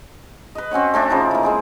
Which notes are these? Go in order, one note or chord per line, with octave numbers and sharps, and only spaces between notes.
B4 D#5
C4 C#4 F#4 C#5
A3 C4 D4 E5
C#3 F3 D#4 D5
A#3 E4
G#3 C4 G#4